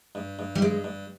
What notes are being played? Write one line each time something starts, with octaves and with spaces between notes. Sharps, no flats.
G2
G2
G3
G2 G#3
G2